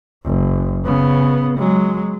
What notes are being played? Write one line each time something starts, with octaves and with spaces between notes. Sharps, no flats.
F#1
C#3 B3
F#3 G#3